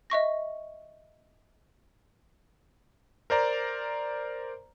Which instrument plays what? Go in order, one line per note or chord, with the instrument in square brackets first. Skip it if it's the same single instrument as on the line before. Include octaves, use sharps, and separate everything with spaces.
[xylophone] D#5 E5 C#6 A#6
[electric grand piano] A#4 C5 D5 A#5